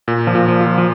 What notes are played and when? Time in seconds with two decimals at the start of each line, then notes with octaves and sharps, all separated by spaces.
0.08 A#2
0.27 F3
0.35 A#2
0.48 F3
0.61 F4
0.67 F3
0.78 F3